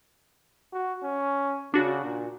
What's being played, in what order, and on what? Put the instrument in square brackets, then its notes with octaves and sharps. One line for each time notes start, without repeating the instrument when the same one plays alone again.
[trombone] F#4
C#4
[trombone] C#3 [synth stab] D4 F#4
[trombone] A#2